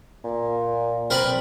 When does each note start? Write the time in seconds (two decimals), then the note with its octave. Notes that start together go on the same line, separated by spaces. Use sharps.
0.24 A#2
1.10 C4 A#4 B4 D5